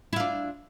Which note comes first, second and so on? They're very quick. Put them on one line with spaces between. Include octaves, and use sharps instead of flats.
E4 F4 D4